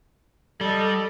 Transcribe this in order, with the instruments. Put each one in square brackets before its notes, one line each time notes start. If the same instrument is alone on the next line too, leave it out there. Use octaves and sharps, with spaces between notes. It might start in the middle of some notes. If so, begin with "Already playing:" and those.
[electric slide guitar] G3 [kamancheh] A4 D#5